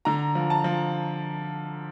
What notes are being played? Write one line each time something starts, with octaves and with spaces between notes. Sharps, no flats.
D3 A#5
F3
A5
F3